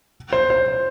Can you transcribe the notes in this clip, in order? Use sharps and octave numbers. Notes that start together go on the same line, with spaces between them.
C5
C5